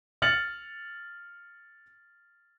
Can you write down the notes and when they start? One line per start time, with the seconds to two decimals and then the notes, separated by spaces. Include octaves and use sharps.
0.22 F6 A6 C#7 F#7